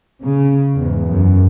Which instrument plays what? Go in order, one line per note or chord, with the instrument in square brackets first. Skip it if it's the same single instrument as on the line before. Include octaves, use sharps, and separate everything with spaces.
[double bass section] C#3
E2 G#2
F#2